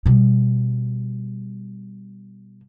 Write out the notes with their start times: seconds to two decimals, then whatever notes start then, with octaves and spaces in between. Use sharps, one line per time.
0.06 B2 G3